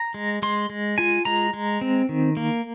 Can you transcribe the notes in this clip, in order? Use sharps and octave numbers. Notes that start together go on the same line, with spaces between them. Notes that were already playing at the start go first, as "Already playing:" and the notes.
Already playing: A#5
G#3
G#3 C6
G#3
F4 G#5
G#3 A#5
G#3
C4
D#3
A#3